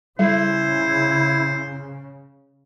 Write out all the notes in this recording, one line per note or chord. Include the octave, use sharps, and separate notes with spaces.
C#3 G3 E4 C5